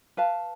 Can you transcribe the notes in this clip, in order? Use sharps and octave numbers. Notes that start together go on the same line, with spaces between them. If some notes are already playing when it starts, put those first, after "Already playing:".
B4 F5 A5